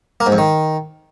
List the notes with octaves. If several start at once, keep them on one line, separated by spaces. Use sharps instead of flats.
A#3
G#2
F2
D#3